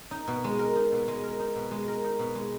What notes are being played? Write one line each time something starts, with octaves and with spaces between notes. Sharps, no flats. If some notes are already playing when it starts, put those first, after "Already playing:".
D#4
B2
G#3
A#4
D#4
B2
G#3
A#4
D#4
B2
G#3
A#4
D#4
B2
G#3